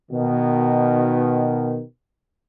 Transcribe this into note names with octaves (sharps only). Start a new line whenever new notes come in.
B2 D#3